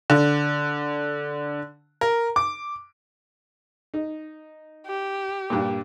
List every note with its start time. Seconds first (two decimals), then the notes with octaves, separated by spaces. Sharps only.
0.10 D3
2.01 A#4
2.36 D6
3.94 D#4
4.87 G4
5.50 G2 A#2